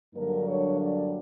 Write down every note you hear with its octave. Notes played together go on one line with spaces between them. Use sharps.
G2 D3 F#3 A#3 D4 A#4
C#5
D5